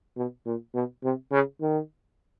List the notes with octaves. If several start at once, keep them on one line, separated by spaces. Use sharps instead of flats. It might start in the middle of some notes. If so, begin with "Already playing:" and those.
B2
A#2
B2
C3
C#3
D#3